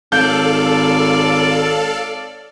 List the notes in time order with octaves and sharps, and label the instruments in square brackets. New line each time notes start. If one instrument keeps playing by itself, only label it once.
[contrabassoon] G#1 [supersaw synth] A4 F5 [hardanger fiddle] C#5 D5 [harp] G6